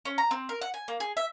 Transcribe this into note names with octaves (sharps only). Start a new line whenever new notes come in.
C#4
A#5
C4
A#4
F#5
G#5
A#3
G#4
E5